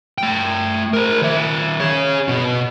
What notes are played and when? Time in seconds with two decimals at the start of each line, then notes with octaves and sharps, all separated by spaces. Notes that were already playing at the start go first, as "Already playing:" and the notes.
0.18 A3 G5
0.94 A#4 C5
1.22 D#3 E5
1.80 G#4 C#5
2.28 B2 F#4